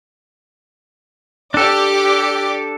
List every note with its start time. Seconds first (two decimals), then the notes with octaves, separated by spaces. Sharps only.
1.54 D4 G4 A4 D5 D6